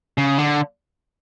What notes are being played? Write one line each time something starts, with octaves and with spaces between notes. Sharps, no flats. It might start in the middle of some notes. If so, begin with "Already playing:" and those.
C#3
D3